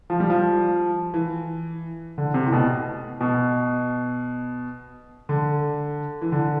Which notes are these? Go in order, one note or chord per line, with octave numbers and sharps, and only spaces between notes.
F3
G3
F3
E3
D3
C3
A2
B2
B2
D3
E3
D3